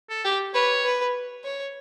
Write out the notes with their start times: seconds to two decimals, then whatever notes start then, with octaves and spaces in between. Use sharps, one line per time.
0.10 A4
0.25 G4
0.54 B4 C#5
0.85 B4
1.44 C#5